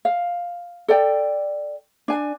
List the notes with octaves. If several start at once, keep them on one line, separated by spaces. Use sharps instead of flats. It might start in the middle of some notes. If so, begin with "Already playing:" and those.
F5
A4 D5 G5
D4 G#5